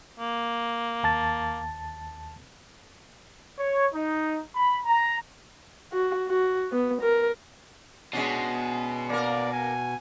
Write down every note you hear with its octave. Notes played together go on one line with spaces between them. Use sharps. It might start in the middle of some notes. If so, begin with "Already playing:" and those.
A#3
D#2 A5 A6
C#5
D#4
B5
A#5
F#4
F#4
B3
A#4
B2 G#3 C#4 D4
A#3 A#4 D5
G#5